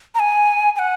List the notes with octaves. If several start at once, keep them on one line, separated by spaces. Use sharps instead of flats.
A#5
G#5
G#5
F#5